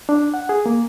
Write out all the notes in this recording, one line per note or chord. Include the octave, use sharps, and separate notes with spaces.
D4
F#5
G#4
A#3